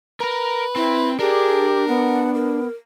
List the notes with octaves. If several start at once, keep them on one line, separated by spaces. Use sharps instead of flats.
A#4 B4 A#5
C4 E4
D4 G4 G#4 A#4
B3 F#5
A#4